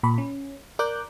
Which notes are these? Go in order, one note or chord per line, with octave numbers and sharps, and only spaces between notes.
A#2 B5
C#4
A#4 D5 D6 F#6 G6